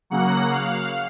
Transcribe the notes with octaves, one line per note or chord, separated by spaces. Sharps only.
C#3 F#3 A#3 F#5
F5